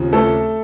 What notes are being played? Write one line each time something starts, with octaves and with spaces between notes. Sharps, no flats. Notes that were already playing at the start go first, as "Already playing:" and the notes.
Already playing: D#2 C#3 F3 C4
A3 A4